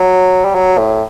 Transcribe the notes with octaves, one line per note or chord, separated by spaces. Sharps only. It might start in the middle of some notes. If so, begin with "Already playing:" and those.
Already playing: F#3
G3
F#3
A2